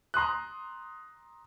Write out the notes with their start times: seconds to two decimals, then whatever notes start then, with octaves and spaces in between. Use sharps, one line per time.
0.14 A#5 C6 D#6 F#6